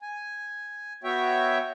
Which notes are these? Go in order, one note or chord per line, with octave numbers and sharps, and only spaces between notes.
G#5
B3 F#4 C#5 E5 G5